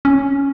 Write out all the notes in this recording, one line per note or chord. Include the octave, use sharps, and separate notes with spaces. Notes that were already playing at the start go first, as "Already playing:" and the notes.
C#4